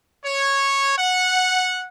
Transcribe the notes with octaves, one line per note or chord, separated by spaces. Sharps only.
C#5
F#5